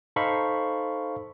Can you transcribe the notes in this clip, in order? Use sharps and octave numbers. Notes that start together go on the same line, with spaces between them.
D#4 A4 C5 F5 B5 C#6